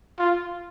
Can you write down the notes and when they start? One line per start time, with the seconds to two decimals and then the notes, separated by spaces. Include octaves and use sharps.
0.19 F4